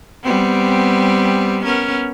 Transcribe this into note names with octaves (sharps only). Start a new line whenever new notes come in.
G3 B3 C4
B3 C#4 A#4